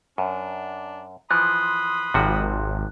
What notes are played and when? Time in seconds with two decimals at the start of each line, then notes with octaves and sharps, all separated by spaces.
0.18 F#2 D4
1.31 E3 F3 B5 C6 D#6 F#6
2.14 G#1 C3 F3 F#4